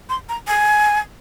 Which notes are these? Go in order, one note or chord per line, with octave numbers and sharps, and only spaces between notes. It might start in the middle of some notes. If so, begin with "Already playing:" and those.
C6
A#5
G#5